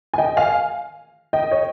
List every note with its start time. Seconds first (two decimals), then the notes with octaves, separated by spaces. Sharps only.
0.14 G#5
0.18 D#5 G5
0.37 F5 G#5
1.33 D#5 G5
1.51 C#5